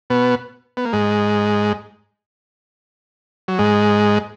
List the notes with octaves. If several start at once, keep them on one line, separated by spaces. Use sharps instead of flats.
B2 B3
B3
A#3
G#2 G#3
F#3
G#2 G#3